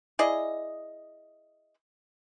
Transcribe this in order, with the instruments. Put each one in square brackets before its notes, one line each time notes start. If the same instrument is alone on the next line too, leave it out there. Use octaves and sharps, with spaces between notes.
[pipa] E4 G#4 D5 D#5